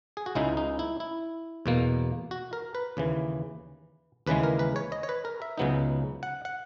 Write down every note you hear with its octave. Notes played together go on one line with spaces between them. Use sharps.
G#4
F#4
C#2 C#3 G#3 D#4 E4
D#4
E4
E4
E2 B2 A#3
F#4
A#4
B4
D#2 C#3 E3
D#2 C#3 E3 G#3 B4
A#4
B4
C#5
D#5
C#5
B4
A#4
E5
C#2 C#3 F#3 B3 D#4
F#5
F#5